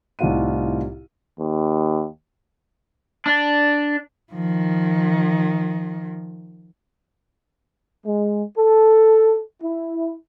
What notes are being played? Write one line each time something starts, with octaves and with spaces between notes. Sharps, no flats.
C2 A2 D#4 F4 F#5 D#7
D#2
D4
D#3 F3
G#3
A4
E4